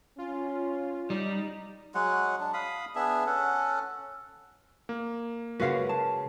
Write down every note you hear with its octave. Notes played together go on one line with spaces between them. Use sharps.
C#4 F4
G3 D#4
F#3 G#3 F#5
D4
F5 B5 D#6
B3 D4 G#4 E5
C#4 A4 F#5
A#3
C#3 G#3 F#4 A#4 B4 F5 F#5
A5